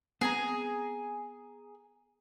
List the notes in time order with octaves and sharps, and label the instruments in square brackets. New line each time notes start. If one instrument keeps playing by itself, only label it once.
[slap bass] B3 C4 [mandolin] G#4 G#5 A#5